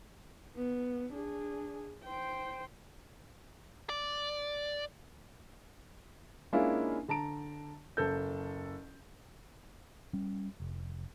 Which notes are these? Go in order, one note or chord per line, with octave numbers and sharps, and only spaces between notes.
B3
D4 G#4
C5 G5
D5
G#3 A#3 C#4 D4 E4 F4
D3 A5 A#5 D7
F#1 A4 G6
G3 C#4
F1